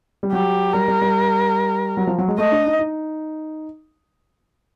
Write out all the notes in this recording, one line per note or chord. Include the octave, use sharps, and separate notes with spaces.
G3
F#3 G4
G3 A#4
G3
G3
F#3
F3
F#3
G#3
A3 D#5
D4
D#4
D#4